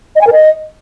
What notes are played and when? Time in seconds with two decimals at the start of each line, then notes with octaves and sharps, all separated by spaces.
0.15 D#5
0.21 G#5
0.27 A#4
0.32 D#5